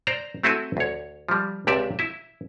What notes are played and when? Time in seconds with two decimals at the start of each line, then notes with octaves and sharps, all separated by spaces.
0.07 C5 D5 A#5
0.43 A3 C4 E4 F#4 A4 G#5
0.77 D2 C#5
1.29 F3 G3
1.67 C#2 C3 G4 D5 E5
1.99 E4 E5